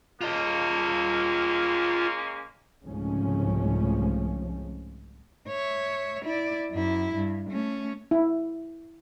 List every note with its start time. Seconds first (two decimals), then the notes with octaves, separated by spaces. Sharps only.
0.21 G#3 A#3 C#4 F4 D#5
2.84 C2 G#2 C#3 F3 A3 C#4
5.48 C#5 E5
6.25 E4 D5
6.71 F#2 E4
7.15 G2
7.49 A3 C#4
8.11 E4